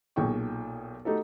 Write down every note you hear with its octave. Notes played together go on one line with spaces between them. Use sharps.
B1 A#2 G#4 G5 C#6
A3 D#4 F#4 G4 A4